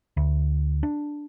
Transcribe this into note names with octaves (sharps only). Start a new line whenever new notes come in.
D2
D4